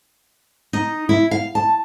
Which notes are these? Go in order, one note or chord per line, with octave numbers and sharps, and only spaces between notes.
D#4
E4
F5
A5